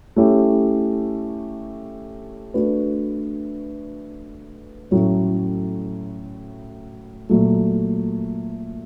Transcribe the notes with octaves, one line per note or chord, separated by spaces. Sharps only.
A3 C#4 E4 G4
A3 D4 F#4 B4
A2 F#3 A3 C#4
A#2 F#3 A3